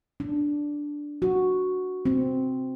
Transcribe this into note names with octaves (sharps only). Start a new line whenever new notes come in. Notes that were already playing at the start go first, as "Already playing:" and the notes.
D4
F#4
C4